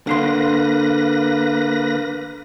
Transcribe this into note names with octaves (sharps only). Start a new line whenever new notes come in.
D3 A#3 B4 F5 C6 A#6